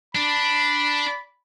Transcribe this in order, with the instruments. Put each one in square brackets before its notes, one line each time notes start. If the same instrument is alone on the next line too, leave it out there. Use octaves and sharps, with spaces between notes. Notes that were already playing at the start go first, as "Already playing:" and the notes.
[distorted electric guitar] D4 [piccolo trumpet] B5